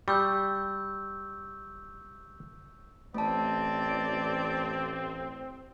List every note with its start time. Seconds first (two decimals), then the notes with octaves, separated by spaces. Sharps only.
0.08 G3 C#6 E6 G6
3.14 A1 A3 C4 D5 A5